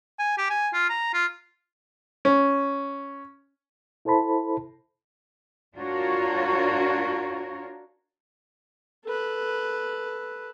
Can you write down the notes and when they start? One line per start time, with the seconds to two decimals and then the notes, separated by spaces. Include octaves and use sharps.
0.19 G#5
0.38 G4
0.50 G#5
0.74 F4
0.90 A#5
1.14 F4
2.25 C#4
4.05 E4 A4 C5 A5 B5
5.75 D4 F4 F#4 A#4 C#5
9.06 A4 B4